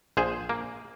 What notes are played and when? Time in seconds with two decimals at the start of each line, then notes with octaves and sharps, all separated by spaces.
0.17 A#1 G#4 C5
0.49 A#3